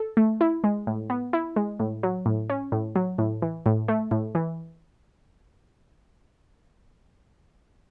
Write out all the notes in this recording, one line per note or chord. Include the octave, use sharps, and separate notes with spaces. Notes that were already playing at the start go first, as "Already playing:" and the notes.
Already playing: A4
A3
E4
G#3
A2
B3
E4
G#3
A2
F#3
A2
C#4
A2
F#3
A2
E3
A2
A3
A2
E3